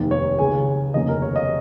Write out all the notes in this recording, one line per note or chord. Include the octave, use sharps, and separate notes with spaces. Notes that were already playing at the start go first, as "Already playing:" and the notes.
Already playing: F1 D#2 D#3
C#5
C#2 C#3 G#3 G#5
F1 D#2 C#3 A#3 C#4 D#5
A#4
C#5
D#5